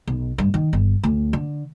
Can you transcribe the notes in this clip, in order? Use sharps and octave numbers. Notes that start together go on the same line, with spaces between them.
B1
G2
D#3
G1
D2
D3